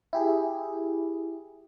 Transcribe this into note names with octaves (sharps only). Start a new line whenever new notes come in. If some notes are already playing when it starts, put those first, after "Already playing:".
E4 G4 G#4